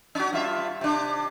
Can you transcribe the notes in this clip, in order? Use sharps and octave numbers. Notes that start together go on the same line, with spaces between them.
C#4 F#4
G2 F4 E5
C3 D4